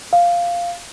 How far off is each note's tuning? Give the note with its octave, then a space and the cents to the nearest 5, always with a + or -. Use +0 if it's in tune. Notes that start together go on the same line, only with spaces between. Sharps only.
F5 -5